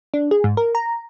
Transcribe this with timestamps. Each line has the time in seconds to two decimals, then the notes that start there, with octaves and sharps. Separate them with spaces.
0.14 D4
0.31 G#4
0.44 G#2
0.57 A#4
0.75 A#5